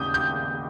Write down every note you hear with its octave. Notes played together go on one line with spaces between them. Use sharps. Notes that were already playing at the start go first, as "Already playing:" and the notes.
Already playing: D#2 C#3 D#6 G6
G6